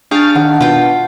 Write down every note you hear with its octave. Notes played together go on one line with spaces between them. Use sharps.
D4 G#4 F5 G5 C#6 F6 A6
D#3 F#5 A5
B2 F4 G5